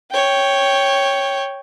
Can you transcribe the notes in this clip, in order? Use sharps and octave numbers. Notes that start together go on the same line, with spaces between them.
C#5 G5